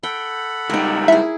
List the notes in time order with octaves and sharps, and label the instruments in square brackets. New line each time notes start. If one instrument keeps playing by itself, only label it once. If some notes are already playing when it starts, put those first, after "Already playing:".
[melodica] A4 F#5 B5 [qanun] G5
[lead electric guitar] C#2 G3 [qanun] D#4 A#4
[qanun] E4 G#4 [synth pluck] E5